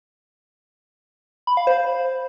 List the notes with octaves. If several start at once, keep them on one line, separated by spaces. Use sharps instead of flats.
B5
F5
C5